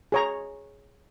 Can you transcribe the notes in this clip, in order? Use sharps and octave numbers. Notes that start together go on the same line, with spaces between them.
G#4 C#5 A#5